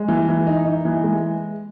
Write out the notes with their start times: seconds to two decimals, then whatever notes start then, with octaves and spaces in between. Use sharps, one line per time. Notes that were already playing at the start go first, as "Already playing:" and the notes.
Already playing: G#3
0.08 E3
0.29 E3
0.47 D#4
0.66 D#4
0.85 E3
1.04 G#3